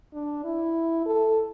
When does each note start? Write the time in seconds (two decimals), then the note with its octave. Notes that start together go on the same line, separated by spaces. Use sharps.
0.13 D4
0.44 E4
1.06 A4